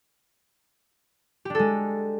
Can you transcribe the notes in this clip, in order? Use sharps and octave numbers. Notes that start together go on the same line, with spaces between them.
G#3 D4 G4 A4